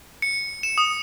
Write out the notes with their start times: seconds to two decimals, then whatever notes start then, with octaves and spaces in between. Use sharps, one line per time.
0.22 C#7
0.63 E7
0.78 D#6